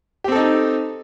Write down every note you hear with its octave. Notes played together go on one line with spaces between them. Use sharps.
C4 D#4 G4 A4